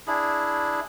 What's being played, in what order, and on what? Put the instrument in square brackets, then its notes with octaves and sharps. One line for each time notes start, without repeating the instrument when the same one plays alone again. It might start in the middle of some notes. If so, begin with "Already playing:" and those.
[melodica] D4 E4 G#4